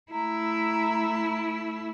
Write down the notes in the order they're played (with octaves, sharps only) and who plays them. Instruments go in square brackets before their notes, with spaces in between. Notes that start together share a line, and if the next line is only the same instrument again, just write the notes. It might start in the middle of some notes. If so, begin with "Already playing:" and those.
[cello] A3 E4 [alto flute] A#5